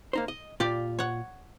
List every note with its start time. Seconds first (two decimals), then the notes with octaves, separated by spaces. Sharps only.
0.13 A#3 D#4 C5
0.28 D#5
0.60 A#2 F4 G4 D5
0.99 C#5 F#5